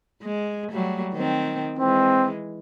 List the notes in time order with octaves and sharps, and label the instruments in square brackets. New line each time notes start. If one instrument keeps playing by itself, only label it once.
[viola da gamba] G#3
F#3 G3 A3
D#3 C4
[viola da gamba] E3 G#3 [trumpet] C4